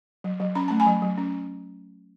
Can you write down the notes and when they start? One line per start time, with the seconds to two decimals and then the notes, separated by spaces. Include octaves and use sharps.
0.24 F#3
0.40 F#3
0.55 C#4 B5
0.68 A3 A5
0.80 G#5 B5
0.86 F#3
1.02 F#3
1.18 C#4